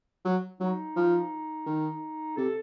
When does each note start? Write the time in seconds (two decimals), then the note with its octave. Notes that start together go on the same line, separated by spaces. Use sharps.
0.25 F#3
0.60 F#3 D#4
0.96 F3
1.66 D#3
2.37 C3 A4